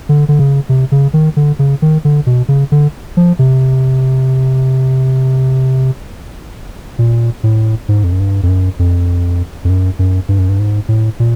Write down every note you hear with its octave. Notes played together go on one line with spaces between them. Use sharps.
D3
D3
C#3
C3
C#3
D#3
D3
C#3
D#3
D3
B2
C#3
D3
F3
C3
A#2
A2
G#2
F2
F#2
G2
F2
F#2
F2
F2
F#2
F#2
G2
F#2
G2
G#2
A2
A#2